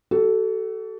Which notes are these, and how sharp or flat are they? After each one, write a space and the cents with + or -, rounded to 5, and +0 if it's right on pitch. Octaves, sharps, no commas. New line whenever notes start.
F#4 +45 A4 +0